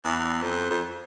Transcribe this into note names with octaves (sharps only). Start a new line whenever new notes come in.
E2
F2
F2